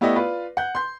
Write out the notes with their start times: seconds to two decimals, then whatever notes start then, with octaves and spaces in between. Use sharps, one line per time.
0.01 A3 B3 E4 G4 D5 D#5
0.16 F4 B4 D5
0.57 F#5 G6
0.75 C6 G6